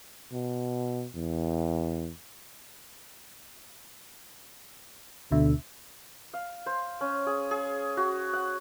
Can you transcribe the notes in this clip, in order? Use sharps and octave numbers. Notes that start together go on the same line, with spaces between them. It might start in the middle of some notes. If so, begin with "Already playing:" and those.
B2
E2
D2 B2 D3 E5
F5
C5
C#4
G#4
G#4
F#4
F#5